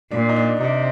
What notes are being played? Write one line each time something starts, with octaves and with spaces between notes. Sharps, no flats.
A#2 D4
D#4
D4
C3 D#4